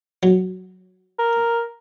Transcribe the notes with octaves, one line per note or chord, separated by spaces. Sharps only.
F#3
A#4